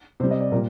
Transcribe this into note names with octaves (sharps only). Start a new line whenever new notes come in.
C3 G3 C5
D#5
D5
A#2 G3 A#4